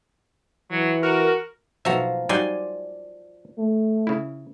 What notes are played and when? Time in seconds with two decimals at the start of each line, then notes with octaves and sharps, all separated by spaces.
0.71 E3 F#3
1.03 F#4 A#4
1.85 B1 F3 F#4 E5 A#5
2.29 F#3 G3 D#4 D5 G#5 C6
3.58 A3
4.07 C#3 E4